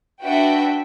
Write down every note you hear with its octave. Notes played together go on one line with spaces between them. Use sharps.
D4 F#4 B4 E5 G5